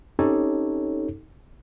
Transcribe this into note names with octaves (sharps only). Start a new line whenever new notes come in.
C4 C#4 D#4 G4 A4 C#5